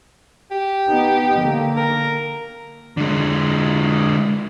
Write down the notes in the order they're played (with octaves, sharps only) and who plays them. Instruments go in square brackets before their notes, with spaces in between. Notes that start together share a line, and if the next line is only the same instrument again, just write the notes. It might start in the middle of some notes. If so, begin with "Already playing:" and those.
[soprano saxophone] G4
[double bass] B3 D#4
D3 A#3
[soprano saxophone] A#4
[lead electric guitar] D3 G#3